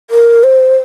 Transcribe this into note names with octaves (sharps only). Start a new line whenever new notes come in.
A#4
C5